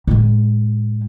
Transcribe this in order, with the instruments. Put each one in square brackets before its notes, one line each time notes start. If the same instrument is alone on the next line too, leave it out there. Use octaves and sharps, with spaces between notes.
[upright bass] A2 G#3